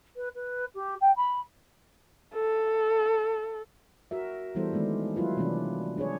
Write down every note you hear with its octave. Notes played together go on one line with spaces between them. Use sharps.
B4
B4
G4
G5
B5
A4
F#4 A#4 E5
E3 G3 B3 E4 A4 C5
D#3 G#3 A3 B3 D4
F#3 E4 F4 B4
C3 E3 G3 B3 C4 D4
D4 G#4 C#5